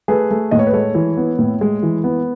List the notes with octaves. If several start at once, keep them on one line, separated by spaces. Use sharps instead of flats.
A3 G#4 B4
A3
A2 D#5
C#5
B4
G#3 A4 C#5
E3
B3
A2
G#3
E3
B3